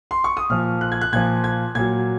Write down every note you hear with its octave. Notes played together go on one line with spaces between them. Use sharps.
C6
C#6
D#6
A#2 F3 F6
F#6
G#6
F#6
A#2 F3 G#6
G#6
A#2 F#3 G#6